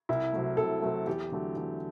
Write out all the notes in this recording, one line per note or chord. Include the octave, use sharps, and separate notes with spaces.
C2 E4
C3 F#3 A3
C2 A4
C3 F#3 A3
E2 G4
D3 F#3 A3
E2